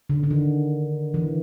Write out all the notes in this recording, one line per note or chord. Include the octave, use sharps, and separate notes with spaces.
D3
D3
D#3
E3